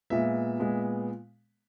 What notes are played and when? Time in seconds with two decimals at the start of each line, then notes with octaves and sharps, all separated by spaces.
0.10 A#2 G#3 B3 E5
0.59 A#2 G#3 B3